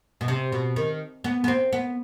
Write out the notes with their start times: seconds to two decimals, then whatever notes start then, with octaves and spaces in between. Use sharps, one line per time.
0.21 B2
0.28 C3
0.52 B2
0.76 D#3
1.24 B3
1.44 B3
1.48 C4
1.73 B3